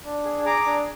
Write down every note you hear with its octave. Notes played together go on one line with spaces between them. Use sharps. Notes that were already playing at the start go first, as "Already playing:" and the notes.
D4
G#4
G#4 A#5 D6
D4